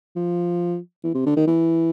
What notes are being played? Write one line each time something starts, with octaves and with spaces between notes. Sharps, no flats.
F3
E3
C3
D3
D#3
E3